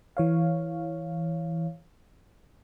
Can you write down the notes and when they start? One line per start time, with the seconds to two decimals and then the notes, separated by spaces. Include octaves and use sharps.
0.17 E3 C#5 F5